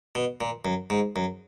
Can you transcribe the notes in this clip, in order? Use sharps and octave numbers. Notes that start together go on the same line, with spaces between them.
B2
A#2
F#2
G#2
F#2